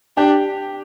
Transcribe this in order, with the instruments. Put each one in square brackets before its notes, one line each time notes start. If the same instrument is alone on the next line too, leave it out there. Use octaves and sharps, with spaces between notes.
[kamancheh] D4 [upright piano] G4